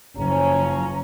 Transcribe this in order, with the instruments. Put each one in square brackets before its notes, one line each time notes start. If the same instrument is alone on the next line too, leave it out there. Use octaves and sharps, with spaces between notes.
[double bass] F#1 [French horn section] F3 C#4 [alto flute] A#5